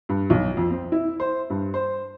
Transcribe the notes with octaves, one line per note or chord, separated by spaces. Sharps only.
G2
B1
F2
C4
E4
C5
G2
C5